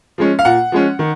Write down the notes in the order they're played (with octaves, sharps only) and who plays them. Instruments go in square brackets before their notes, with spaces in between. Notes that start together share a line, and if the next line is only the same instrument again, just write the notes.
[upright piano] F3 G#3 C#4
F5
A#2 F#5
F3 G#3 C#4
D#3